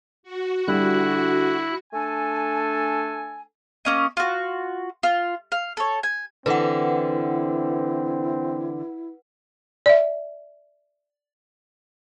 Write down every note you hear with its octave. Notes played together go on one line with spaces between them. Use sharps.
F#4
D3 G3 E4 F#6
A3 D4 A4 G#5
A#3 C#4 D#5
F4 F#4
F4
F5
A4 C#5
G#5
D3 E3 C4 E4 B4 F#5
D5 E5